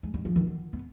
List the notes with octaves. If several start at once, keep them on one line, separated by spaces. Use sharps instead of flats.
G#3
G3
F3
D#3
D3
B3